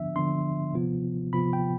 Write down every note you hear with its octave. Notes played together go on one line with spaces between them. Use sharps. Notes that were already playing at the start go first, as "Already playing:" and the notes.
Already playing: D3 F3 B3 D4 E5
D3 F3 B3 D4 C6
C3 F3 B3 F4
C3 F3 B3 F4 B5
G5